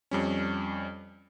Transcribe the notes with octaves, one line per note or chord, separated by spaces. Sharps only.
F2 G3 C#4